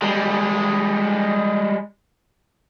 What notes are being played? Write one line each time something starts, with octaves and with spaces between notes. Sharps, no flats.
G3 G#3